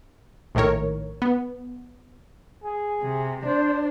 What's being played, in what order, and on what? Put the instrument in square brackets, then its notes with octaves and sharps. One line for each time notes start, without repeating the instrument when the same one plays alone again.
[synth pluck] A#1 A2 D#3 A#4 C#5
B3
[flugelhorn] G#4
[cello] C3
[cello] D4 [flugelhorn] C5